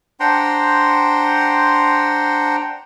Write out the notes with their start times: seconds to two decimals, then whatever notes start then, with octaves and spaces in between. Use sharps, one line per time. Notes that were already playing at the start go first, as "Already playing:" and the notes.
0.20 D4 C5 F#5 G5 A#5 C6